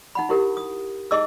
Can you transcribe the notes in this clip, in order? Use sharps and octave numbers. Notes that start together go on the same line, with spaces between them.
D#4 F#5 B5
E4 G4 A#4
D#6
D#4 G#4 D#5 D6 E6